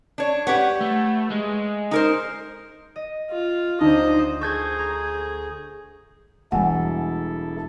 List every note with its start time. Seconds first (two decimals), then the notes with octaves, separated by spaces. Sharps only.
0.18 D4 C#5
0.47 G4 B4 C#5 F#5
0.81 A3
1.30 G#3
1.91 D#4 A#4 C5
2.96 D#5
3.30 F4
3.81 D2 D4 D#4 C5 D#5
4.41 G#4 A4 C5 C#6 G6 G#6
4.79 A#5
6.52 E1 G3 G#3 E4 A4 F#5 G#5